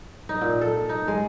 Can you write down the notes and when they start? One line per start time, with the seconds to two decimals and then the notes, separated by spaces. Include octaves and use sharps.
0.29 D#4
0.41 A#2
0.61 A4
0.89 D#4
1.08 G#3